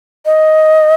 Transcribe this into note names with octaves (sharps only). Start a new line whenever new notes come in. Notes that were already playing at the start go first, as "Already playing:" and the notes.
D#5